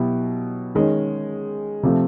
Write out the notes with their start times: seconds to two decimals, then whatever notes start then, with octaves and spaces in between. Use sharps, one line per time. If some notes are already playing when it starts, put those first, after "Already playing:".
Already playing: B2 F#3 B3 E4 G4
0.75 D#3 G#3 C#4
1.83 C3 F3 A3